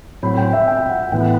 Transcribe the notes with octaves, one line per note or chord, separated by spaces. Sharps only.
A2 F#3 C4 B5
G5
E5
G5
F#5
A2 E3 B3 G5